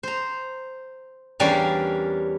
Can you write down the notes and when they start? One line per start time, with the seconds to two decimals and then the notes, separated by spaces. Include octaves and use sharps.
0.03 C5 A#5
1.40 E2 G3 C#4 D4 A#4 F5